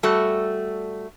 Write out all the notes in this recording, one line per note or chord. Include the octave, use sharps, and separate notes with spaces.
G3 A3 F#4 A4